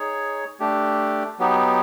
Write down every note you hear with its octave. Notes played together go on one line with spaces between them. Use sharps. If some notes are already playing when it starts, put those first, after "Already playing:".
Already playing: D#4 G#4 C#5
A3 D4 G4
F#3 B3 D#4 G4